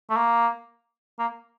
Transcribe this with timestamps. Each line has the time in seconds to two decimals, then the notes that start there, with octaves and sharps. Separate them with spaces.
0.10 A3
0.17 A#3
1.19 A#3